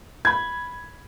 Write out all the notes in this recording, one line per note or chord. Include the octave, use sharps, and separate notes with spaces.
B5 G#6